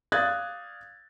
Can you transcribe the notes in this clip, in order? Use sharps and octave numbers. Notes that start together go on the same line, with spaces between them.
D5 F5 D#6 F#6 G#6 A6